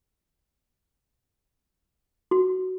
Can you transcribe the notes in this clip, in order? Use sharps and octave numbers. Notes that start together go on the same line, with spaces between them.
F#4